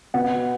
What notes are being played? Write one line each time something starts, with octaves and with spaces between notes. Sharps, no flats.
B2 F#5